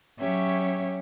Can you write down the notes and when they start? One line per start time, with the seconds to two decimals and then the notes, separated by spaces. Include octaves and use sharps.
0.19 F#3 C#4 G4 C#5 E5